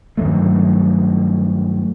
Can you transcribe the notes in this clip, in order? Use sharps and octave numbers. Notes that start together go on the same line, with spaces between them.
G2 D#3 F#3 A3